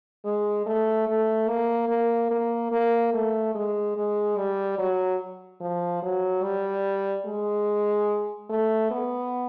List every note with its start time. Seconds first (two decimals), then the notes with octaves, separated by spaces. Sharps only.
0.25 G#3
0.66 A3
1.08 A3
1.49 A#3
1.89 A#3
2.31 A#3
2.72 A#3
3.14 A3
3.55 G#3
3.96 G#3
4.37 G3
4.78 F#3
5.61 F3
6.03 F#3
6.43 G3
7.26 G#3
8.50 A3
8.91 B3